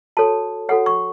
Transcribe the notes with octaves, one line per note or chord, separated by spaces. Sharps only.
F#4 A4 C#5 A5
F#4 A4 C#5 F#5
C#6